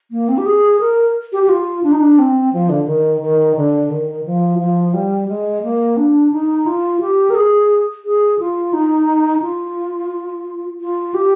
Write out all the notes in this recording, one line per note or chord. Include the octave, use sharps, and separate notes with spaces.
A#3
C4
G4
G#4
A#4
G4
G4
F4
D4
D#4
D4
C4
F3
D3
D#3
D#3
D3
D#3
F3
F3
G3
G#3
A#3
D4
D#4
F4
G4
A#4
G#4
G#4
F4
D#4
F4
F4
G4